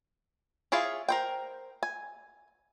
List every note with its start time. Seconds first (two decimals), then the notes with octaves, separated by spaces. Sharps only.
0.72 E4 F4 G#4 C#5 F5
1.09 A#4 C5 G5
1.83 G#5